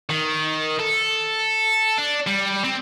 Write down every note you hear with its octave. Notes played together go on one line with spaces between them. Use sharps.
D#3
A4
D4
G3
C4